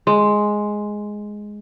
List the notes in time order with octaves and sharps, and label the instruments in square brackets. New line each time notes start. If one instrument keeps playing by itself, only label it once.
[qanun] G#3 [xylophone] C6